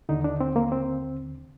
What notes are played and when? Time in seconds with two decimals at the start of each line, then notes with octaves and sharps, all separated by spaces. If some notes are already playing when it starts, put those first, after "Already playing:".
0.09 D#2 D3 D#4
0.24 D4
0.41 C4
0.56 A#3
0.72 C4